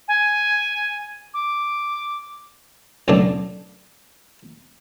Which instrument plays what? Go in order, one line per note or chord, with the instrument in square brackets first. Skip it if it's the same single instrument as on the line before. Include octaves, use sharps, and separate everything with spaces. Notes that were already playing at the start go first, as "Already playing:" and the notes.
[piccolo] G#5
D6
[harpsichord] B1 F#2 A2 D3 D4